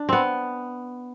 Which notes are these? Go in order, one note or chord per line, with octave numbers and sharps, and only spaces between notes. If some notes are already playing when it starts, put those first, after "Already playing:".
Already playing: D4
B3 C4